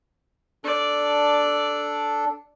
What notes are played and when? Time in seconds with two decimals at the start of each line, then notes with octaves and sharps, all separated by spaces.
0.64 D4 A4 D5